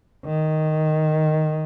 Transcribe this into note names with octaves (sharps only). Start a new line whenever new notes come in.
D#3